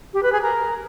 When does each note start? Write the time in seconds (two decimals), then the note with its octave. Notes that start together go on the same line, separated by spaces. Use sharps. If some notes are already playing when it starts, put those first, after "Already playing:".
0.13 G4
0.22 B4
0.32 G#4
0.41 A#4